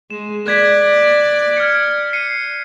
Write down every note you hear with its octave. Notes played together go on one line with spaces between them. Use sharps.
G#3 E7
D5 F#6 G#6 B6
F6 G#6 C#7
C7 C#7 D#7